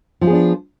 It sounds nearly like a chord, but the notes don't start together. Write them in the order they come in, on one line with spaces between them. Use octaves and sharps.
F3 E4 G#4 B3 D4